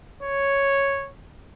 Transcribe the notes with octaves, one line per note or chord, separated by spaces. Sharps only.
C#5